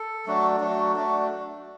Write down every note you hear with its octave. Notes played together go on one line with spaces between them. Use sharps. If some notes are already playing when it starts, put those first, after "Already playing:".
Already playing: A4
F#3 A3 D4 F#4
F#3 A3 D4 F#4
A3 D4 F#4